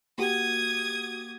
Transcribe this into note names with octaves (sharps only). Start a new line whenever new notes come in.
A#3 F#4 G4 D#6 G#6